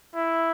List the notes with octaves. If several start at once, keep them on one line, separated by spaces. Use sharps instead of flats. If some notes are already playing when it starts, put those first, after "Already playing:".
E4